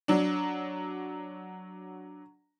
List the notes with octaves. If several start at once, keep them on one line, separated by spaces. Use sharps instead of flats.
F#3 D4